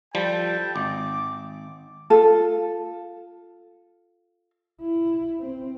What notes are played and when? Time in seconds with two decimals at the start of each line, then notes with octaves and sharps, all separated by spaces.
0.15 F3 G3 A4 G5 A5
0.76 G#1 D6
2.10 F4 A4
4.81 E4
5.40 C4